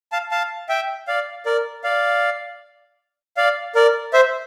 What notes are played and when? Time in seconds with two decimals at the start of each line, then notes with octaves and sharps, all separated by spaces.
0.12 F5 A5
0.31 F5 A5
0.69 E5 G5
1.07 D5 F5
1.45 A#4 D5
1.84 D5 F5
3.37 D5 F5
3.75 A#4 D5
4.13 C5 E5